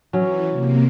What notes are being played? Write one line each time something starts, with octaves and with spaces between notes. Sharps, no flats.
E3 F#3 C#4
C3 A#3